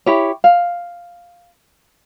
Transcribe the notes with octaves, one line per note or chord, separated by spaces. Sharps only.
E4 G4 C#5
F5